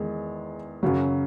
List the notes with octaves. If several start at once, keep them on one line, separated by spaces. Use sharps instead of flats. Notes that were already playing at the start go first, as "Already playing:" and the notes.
Already playing: E2 D#3 G#3
F#2 C#3 F#3